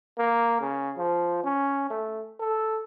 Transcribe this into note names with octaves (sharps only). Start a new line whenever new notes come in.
A#3
C#3
F3
C#4
A3
A4